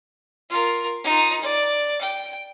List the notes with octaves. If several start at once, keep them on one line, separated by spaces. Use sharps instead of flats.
F4 A#4
D#4 F4
D5
G5